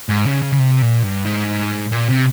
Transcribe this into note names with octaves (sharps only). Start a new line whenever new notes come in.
G#2
C#3
C#3
C#3
C3
A#2
G2
G#2
A#2
C3